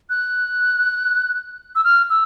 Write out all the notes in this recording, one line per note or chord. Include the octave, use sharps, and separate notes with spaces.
F#6
E6
F6
E6